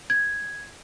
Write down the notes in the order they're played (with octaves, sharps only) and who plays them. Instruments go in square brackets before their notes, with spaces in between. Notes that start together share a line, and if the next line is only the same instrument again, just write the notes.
[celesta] G#6